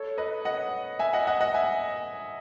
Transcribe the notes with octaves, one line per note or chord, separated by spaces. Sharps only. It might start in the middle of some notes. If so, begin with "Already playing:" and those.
Already playing: A4 C#5
B4 D#5
D#5 F#5
E5 G#5
D#5 F#5
D#5 F#5
D#5 F#5
E5 G#5